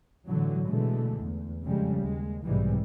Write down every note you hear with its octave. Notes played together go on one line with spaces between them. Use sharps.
A2 D3 E3 F#3
B2 D3 E3 G#3 A3
E2
F2 C#3 G3 G#3
D#2 G#3
B1 G#2 C3 E3 G3 G#3